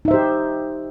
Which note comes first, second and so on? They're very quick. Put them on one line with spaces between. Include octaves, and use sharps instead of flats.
D#4 E5 C5 G4